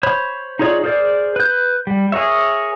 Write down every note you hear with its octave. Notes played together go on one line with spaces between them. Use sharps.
C5 C#5 B5
D#4 F4 G#4 C#5 D5
G#4 A#4 C5 D5
B4 G6
G3
G#4 A#4 C#5 E5